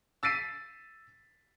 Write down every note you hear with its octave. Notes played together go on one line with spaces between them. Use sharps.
E6 A6 B6 C7 D#7